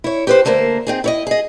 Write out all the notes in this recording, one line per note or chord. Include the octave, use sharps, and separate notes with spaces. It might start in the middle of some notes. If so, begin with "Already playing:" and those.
E4 C#5
G4 B4 C5
D3 A3 A#3 A#4 C5
C4 D#4 G#4
E4 C#5 D#5
G#4 D#5